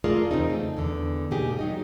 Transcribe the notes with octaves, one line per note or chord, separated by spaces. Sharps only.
A3 F4 G#4 A#4 D5
E2 C#3 C4 D#4
A3
E2 D3
G#2 B2 A#3 D#4 G4 G#4
F#3 D#4 D#5